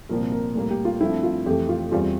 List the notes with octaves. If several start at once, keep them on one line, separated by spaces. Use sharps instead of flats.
C2 A#2 F3 C4 A#4
A#4
A2 G3 A#3
G4
F4
G2 F3 A3 C4 E4
F4
F2 E3 A3 G4
F4
E2 E3 G3 C4 F4